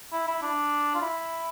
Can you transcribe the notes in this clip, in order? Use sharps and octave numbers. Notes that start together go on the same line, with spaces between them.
E4
E4
D4
F4
E4